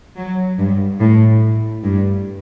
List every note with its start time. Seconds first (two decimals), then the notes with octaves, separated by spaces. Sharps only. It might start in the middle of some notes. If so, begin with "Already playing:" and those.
0.16 F#3
0.58 G2
1.00 A2
1.83 G2